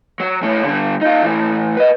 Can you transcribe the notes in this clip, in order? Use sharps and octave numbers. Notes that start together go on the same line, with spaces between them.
F#3
A2 C#4
D3 G3
D#4 F4
A2 E3
B4 D#5